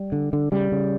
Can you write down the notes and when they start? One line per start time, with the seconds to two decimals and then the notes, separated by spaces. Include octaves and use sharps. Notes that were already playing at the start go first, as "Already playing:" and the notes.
Already playing: G3
0.12 D3
0.33 D3
0.52 C#3 G3
0.72 C#3